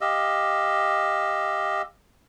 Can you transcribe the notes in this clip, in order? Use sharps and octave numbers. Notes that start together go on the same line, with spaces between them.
G4 D#5 F5 E6